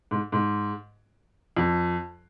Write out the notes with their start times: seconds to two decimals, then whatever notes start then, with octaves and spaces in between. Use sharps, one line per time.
0.11 G#2
0.32 G#2
1.57 F2